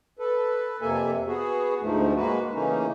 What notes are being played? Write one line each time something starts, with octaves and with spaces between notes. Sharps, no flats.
A4 B4
F2 C3 A#3 A4 E5 G#5
B3 F#4 G#4
D2 G#2 F3 A3
G#3 A#3 F#4 B4
C#3 E3 A3 A#3 C#4 D#4